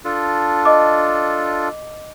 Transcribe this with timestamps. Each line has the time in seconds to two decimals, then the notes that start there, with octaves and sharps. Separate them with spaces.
0.05 D4 F4 A4
0.65 D#5 D6